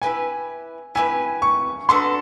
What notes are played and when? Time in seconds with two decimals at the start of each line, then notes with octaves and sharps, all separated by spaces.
0.02 E4 G4 B4 G#5
0.95 E4 G4 B4 G#5
1.42 C#6
1.89 B3 D4 F#4 A4 C6